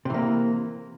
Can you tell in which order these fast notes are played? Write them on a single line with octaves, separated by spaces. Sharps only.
C3 E3 A#3